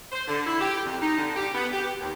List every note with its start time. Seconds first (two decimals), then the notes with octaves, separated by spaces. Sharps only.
0.12 C5
0.27 D3
0.46 E4
0.60 G4
0.86 F2
1.01 D#4
1.18 D3
1.35 G4
1.55 B3
1.73 G4
2.00 D#2